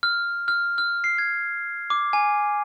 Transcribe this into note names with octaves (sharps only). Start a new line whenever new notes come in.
F6
F6
F6
C7
G#6
D6
G#5